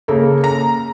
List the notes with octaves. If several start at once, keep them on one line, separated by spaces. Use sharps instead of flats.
C#3 A#3 A4 A#4
A#5